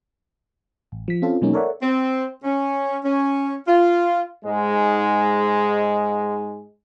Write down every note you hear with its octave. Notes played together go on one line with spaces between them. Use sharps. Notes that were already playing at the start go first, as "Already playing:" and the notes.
A1
F3 B6
C4 C#4 F4 A4
B2 F#3 G#3 A#3 C#4 D#4
A4 A#4 C#5 D5 E5 F#5
C4
C#4
C#4
F4
G#2 G#3